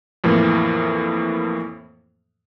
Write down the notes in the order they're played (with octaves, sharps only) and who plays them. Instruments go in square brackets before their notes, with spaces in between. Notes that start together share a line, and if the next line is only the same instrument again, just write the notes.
[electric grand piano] F2 A2 E3 A#3